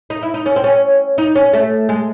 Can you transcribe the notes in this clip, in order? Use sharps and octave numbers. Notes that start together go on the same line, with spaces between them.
D#4
E4
D#4
C#4
C4
C#4
D#4
C#4
A3
G#3